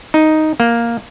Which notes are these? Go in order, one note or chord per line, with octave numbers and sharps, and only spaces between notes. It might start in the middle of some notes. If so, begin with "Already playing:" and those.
D#4
A#3